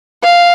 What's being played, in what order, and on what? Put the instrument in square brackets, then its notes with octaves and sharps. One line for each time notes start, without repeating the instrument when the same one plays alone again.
[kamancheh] F5